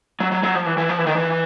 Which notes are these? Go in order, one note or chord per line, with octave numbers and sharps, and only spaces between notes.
F#3
F#3
F#3
F3
E3
E3
F3
E3
D#3
E3